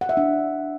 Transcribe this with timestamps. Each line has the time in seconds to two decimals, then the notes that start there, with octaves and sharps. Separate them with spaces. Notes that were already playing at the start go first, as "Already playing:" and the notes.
0.01 F#5
0.09 E5
0.17 D4